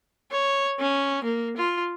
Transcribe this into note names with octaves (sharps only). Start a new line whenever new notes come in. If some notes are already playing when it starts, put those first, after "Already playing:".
C#5
C#4
A#3
F4